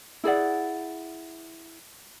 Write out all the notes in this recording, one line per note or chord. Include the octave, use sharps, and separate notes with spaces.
E4 G#4 D5 F#5